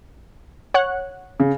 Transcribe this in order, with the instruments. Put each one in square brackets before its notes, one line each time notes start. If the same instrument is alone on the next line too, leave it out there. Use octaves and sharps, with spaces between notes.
[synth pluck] C#5 F#5 F#6
[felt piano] C#3